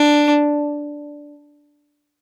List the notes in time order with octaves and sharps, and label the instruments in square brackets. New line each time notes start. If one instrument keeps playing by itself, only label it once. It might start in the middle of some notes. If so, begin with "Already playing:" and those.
Already playing: [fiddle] D4